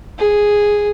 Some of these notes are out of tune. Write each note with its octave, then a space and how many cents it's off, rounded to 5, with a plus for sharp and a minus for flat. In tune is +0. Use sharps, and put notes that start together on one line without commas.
G#4 -5